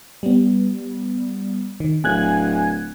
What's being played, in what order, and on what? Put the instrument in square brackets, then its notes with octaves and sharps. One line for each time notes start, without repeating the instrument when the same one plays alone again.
[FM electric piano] G3 B3
D#3
[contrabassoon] D1 [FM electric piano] G#5 F#6 G#6